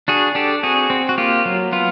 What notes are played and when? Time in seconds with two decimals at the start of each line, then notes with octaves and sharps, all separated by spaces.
0.08 D4 F#4 G#4
0.35 D4 G4 A4
0.63 C4 F#4 G#4
0.90 C4
1.09 F#4
1.18 A#3 F4 G4
1.45 F#3
1.72 B3 F4